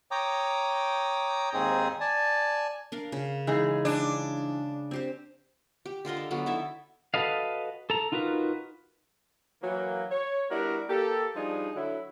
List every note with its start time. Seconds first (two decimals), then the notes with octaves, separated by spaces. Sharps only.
0.11 C#5 G5 A#5 D6 D#6
1.53 D#2 G#2 C4 D#4 G#4 D#6
2.01 D5 G#5 A5
2.92 D4 A#4 F5
3.12 C#3
3.47 E3 G#3 D#4 G#4
3.85 D4 G#5
4.91 C4 G4 C5
5.86 G4
6.05 D3 F4 A#4 D#5
6.17 A4
6.31 D3 F#3 B3
6.46 D#4 E4 A4 E5
7.14 F#4 A4 B4 D#5 F5
7.90 A4 A#5
8.12 D#4 F4 F#4 A#4 B4
9.63 E3 F#3 A#3
10.11 C#5
10.50 G3 B3 D4 E4 F#4 A#4
10.89 A#3 G4 A4
11.36 F3 G3 D4 D#4 G#4
11.76 D3 F#3 E4